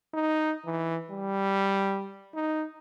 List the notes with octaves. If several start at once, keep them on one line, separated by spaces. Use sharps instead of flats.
D#4
E3
G3
D#4